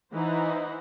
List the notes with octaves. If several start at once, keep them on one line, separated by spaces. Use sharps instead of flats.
E3 D#4 E4 C5 F#5 A#5